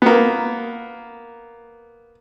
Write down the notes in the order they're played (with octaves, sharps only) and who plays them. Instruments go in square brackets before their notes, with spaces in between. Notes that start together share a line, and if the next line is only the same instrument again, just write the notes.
[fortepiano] A#3 B3